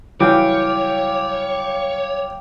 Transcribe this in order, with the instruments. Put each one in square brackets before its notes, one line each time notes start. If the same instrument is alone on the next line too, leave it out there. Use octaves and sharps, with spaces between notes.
[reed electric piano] C#3 F#3 G3 [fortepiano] E3 [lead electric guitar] C#5 [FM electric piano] F5 G5 D6